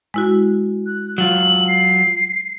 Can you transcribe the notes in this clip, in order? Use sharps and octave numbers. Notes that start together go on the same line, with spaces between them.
G#3 E4 F#4
F#6
F#3 F4 F#7
C7